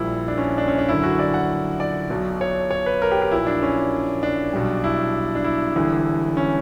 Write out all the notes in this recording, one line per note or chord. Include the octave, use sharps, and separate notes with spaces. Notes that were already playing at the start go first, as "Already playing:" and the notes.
Already playing: A#1 A#2 G3 E4
D4
C#4
D4
C#4
D4
F#1 F#2 D3 E4
F#4
D5
F#5
D5
B1 B2 F#3
C#5
C#5
B4
A#4
G4
G4
A#1 A#2 F#3 E4
D4
C#4
D4
B1 B2 G3
E4
D4
E4
E1 E2 D3 G3
C#4